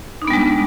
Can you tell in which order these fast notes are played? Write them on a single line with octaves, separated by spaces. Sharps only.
D#4 D4 B3 G3 G#3